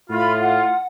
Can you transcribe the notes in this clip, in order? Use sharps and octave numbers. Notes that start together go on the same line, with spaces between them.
A2 F4 B5
F#5